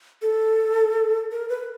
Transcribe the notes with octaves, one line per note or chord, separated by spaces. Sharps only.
A4
A#4
B4